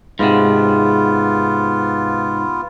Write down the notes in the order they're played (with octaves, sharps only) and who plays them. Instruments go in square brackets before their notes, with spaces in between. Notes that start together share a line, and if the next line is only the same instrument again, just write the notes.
[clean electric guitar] G#2 C3 [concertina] B3 F4